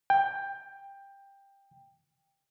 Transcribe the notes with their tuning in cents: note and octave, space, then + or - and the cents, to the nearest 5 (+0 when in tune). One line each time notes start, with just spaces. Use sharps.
G5 +15